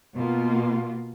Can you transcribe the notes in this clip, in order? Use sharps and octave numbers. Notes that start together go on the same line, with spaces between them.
B2 A#3 F4